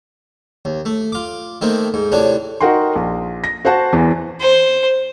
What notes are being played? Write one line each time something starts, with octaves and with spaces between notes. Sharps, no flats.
D#2
A3
F4 D6
D#3 A3 A#3 C4
G#2
A2 C3 D4 C#5
D#4 F#4 A#4 F#5 G5 C6
A#1
A#6
F#4 C5 F#5 A5
E2 E3
C5